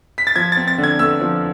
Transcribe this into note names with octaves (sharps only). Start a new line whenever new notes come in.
B6
A6
F3 G#6
C4 A6
A6
D3
G#6
A3 E6
F3